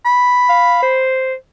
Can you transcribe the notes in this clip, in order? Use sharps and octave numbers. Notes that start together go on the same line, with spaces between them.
B5
F5
C5